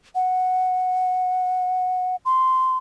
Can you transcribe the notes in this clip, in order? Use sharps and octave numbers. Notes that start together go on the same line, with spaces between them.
F#5
C6